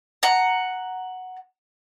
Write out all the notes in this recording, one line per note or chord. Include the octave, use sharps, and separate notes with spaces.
F#5 A#5